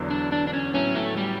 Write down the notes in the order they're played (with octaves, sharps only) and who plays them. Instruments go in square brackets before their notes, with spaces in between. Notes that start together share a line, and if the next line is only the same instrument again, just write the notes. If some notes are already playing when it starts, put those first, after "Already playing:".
Already playing: [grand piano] E2 D3 F#3 B3
[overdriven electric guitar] D4
D4
D4
C#4
[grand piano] A2 F#3 B3 E4 [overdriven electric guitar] C#4
[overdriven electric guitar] A3
G3